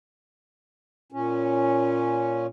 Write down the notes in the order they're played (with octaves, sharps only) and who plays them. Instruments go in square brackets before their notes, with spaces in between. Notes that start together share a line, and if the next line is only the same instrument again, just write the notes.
[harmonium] A#2 C#4